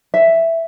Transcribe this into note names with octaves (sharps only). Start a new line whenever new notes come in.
E5